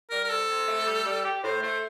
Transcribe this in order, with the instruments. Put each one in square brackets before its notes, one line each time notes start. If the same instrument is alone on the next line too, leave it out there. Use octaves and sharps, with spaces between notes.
[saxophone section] G3 [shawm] A#4
[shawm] A#4
[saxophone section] C3 [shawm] A4
[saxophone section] C3
A3
G3
G3
G4
[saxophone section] A2 [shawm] C5
[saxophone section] A3 [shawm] C5